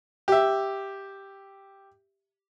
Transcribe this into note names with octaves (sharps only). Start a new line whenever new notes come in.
G4 E5